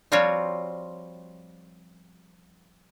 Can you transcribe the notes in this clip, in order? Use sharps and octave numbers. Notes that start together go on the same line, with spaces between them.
F3 G3 C4 F4 F#4 C#5